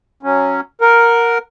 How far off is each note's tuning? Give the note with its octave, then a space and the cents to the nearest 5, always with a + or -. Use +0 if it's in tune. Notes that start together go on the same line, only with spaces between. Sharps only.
F#3 +0 C#4 +0
A#4 +0 F#5 -20